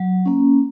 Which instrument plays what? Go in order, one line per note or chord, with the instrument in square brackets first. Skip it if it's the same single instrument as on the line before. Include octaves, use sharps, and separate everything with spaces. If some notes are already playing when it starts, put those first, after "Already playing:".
Already playing: [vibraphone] F#3
A#3 C#4